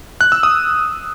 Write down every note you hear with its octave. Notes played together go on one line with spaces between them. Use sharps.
F#6
E6
D#6